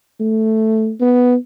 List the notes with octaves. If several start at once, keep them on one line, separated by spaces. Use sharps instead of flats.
A3
B3